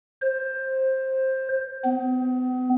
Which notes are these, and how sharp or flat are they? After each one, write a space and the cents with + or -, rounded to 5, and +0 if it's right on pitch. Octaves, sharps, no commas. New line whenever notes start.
C5 +15
B3 +40